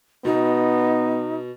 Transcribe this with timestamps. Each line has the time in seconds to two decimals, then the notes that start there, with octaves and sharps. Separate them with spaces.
0.25 B2 B3 D#4